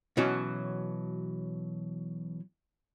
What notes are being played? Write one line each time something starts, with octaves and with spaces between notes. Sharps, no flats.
B2 E3 F#3 C#4 F#4